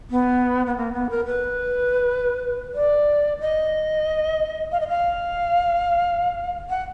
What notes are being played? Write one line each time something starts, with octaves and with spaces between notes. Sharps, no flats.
B3
B3
A#3
B3
A#4
B4
D5
D#5
F5
D#5
F5
F#5